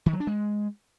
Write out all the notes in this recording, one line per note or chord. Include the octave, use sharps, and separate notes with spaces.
D#3
F#3
D4
G#3